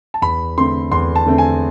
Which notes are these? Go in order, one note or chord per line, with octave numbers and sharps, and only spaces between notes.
A5
E2 B5
D3 A3 C4 C6
E2 C6
A5
D3 A3 C4
G#5